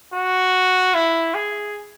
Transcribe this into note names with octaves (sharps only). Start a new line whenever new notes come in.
F#4
E4
G#4